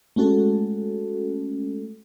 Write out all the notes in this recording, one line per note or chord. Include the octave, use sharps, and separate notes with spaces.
G#3 A3 C#4 F#4 A4